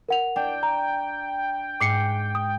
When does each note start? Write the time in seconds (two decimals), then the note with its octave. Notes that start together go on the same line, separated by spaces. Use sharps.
0.09 A#4 F#5 F7
0.36 D4 G5
0.63 A#5
1.80 G#2 D6 C7 C#7
2.35 D#6